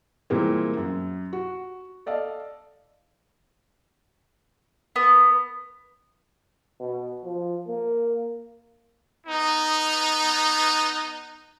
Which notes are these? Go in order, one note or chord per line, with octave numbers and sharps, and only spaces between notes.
A#2 E3 G3 G#3 A#3 C4
F#2
F#4
A4 D5 D#5 F5
B3
B2
F3
A#3
B3 D#4